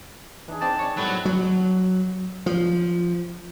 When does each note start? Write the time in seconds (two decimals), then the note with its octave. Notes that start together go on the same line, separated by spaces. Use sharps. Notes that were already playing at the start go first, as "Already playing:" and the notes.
0.48 E3 D4 D#4 G#4
0.61 C4 D5 D#5 G5 A5
0.79 C#5 D5
0.97 A2 F#3 G3 B3 C4
1.25 F#3
2.46 F3